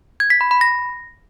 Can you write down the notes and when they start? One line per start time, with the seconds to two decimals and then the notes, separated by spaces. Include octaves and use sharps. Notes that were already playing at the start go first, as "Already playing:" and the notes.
0.20 G#6
0.30 B6
0.41 B5
0.51 B5
0.61 A#6